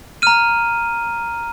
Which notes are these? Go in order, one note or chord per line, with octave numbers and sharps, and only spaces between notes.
A#5 F6 D#7